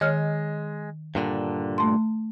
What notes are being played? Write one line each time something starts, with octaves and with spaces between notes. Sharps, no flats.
D#3 G#3 C#5 F6
G2 A#2 D3
A3 C6